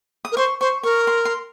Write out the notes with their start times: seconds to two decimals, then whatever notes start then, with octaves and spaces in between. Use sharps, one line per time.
0.25 D#6
0.32 A#4
0.37 C5 C#6
0.61 C5 C#6
0.83 A#4 C#6
1.07 C6
1.25 C6